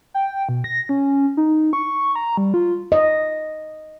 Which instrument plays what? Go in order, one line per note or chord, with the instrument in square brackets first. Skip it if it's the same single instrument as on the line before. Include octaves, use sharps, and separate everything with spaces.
[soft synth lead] G5
B2
A#6
C#4
D#4
C#6
A#5
G3
F4
[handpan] D#5